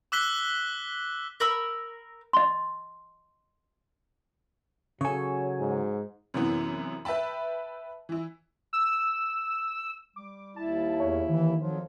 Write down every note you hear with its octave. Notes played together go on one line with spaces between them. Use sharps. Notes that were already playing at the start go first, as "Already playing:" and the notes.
D6 E6 F#6 B6 G7
A#4 B5 E6
D#5 C6
C#3 F#3 A4 C#5 G#5
G#2
F#2 C3 E3 B3
B4 E5 G5 A5 B5
E3 E4
E6
G3 D6
D#2 E4 A5
E2 C#5
D#3 E3
F2 F3 F#3